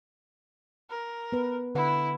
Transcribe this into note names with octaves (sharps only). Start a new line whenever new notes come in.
A#4
B3 B4
D3 E4 B4 F#5